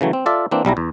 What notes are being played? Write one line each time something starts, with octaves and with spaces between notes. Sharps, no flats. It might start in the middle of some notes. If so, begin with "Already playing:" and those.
C#3 E3 F#3 A3
C4
F4 A4 D5 E5
E3 A#3 C4 D4
B1 G3 E4 A#5
E2